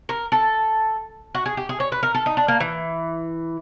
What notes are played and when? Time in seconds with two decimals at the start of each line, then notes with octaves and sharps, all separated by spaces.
0.09 A#4
0.32 A4
1.35 F#4
1.46 G#4
1.57 G4
1.69 G#4
1.80 C#5
1.92 B4
2.03 A#4
2.15 A4
2.26 D#4
2.37 D4
2.48 A#3
2.60 E3